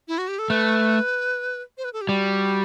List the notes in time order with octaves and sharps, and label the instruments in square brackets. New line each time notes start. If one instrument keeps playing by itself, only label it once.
[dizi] E4
F#4
G4
A4
[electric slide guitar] A3 [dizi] B4
[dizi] C5
B4
A4
G4
[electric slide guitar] G3 [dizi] F#4